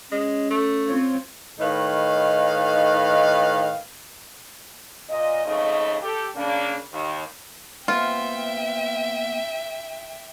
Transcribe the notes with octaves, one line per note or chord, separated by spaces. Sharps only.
G#3 C#4
A3
C4 F4 C#5
A2 D#3 D#4 B4 F5
A#2 D#5
F2 G#2 C#3 A3 D#5
G4 A4
C#3 A#3 D4
D#2
A#3 B3 F4 C5 E5 G5